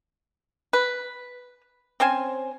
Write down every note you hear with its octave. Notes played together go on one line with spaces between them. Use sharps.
B4
C4 C#4 C5 G#5